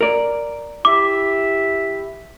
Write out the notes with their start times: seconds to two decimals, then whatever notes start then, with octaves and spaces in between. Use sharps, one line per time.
0.01 A#4 D5
0.85 E4 G4 E5 D6